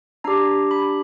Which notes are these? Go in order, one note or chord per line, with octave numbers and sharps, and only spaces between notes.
D4 G4 A#5
B5